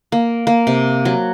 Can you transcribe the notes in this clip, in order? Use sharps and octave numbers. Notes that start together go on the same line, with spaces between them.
A#3
A#3
C3
F#3